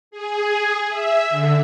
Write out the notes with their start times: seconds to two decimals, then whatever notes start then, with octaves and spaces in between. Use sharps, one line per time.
0.11 G#4
0.90 E5
1.30 D3